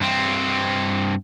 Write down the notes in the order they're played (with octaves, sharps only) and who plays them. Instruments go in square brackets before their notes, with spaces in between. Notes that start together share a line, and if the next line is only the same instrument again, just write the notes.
[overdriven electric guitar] G2 C4